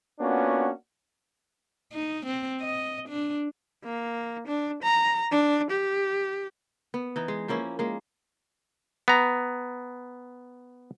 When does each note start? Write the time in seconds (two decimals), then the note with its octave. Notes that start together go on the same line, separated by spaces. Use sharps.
0.20 A#3 B3 C#4 D4 F4 F#4
1.93 D#4
2.26 C4
2.62 D#5
3.09 D4
3.84 A#3
4.47 D4
4.83 A#5
5.31 D4
5.70 G4
6.94 B3
7.16 E3 D#4
7.28 G#3
7.48 F3 A#3 C#4 E4
7.79 G#3 A#3
9.08 B3 A#5